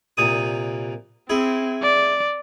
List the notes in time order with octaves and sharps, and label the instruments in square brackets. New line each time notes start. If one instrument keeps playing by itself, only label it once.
[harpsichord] C2 A#2 D#6
[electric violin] C4 [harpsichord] E4 G#4
[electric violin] D5